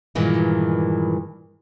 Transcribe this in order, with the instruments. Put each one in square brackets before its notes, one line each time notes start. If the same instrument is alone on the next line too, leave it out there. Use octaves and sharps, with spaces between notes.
[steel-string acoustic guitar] G2 A#2 D#3 E3 G#3